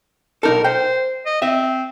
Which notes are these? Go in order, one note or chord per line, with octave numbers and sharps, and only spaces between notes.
B1 D#4 A4 A#4
C5 G5
D#5
C4 E5